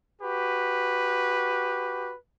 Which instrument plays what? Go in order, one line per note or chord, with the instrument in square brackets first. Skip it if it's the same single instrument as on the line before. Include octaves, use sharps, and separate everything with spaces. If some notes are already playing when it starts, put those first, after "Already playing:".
[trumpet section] F#4 G4 B4